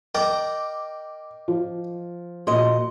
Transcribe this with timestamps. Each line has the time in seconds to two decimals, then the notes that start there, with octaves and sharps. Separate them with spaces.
0.15 A#4 D5 D#5 G5 D6
1.48 F3
2.47 A#2 F#4 D#5 C6